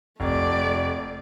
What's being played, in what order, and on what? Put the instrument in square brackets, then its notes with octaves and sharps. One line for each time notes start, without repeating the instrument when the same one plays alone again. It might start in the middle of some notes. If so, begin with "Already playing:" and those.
[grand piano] F1 [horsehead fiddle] A3 D5